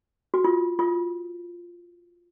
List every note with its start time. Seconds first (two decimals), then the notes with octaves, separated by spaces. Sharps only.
0.34 F#4
0.44 F4
0.79 F4